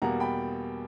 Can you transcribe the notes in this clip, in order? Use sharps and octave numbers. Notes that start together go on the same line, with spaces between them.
E2 B2 G3 A#3 F#5 A#5
G5 B5